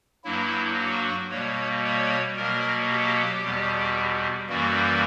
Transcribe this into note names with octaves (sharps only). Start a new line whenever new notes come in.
G2 F#3 A#3 E4
F#4
B2 G3 A#3 C#5
C#5
B2 F#3 A#3 A#4
G4
E2 B2 G3
F#2 E3 G3 A#3 F#4